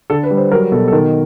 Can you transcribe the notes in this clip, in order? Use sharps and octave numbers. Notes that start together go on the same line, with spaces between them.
D3 A4
B4
G3
C5
F#3 A#4
B2 A4
A4
D#3 A#4